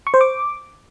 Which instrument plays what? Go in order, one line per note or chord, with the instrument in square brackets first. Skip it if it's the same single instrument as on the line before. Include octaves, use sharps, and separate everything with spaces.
[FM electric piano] C#6
C5
D6